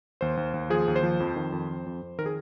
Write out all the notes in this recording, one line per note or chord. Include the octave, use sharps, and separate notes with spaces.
D#2 C5
D#2
D#2
F3 G#4
D#2
C5
F3
F2
D#3
F2
F2
F2
F2
D#3 A#4
G#4